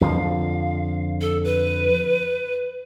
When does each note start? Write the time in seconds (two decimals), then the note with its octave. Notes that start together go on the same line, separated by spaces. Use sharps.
0.01 F2 D3 F3 F5
1.21 A4
1.44 B4